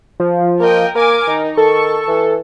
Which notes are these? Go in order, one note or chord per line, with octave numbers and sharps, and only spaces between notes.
F3
A#3 A#4 D#5 G5
A#3 A#4 G#5 D6
D#3 D#4
D#3 A4 C#6
E3